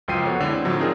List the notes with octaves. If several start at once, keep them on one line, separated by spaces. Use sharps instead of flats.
C#2 F#2 F3 G5 C7 D#7
B3 F#4 A4 C#5
D3 G#3 E4
C4
A2 D3 F3 F#3
C4 D4 D#4 F4 G#4 A#4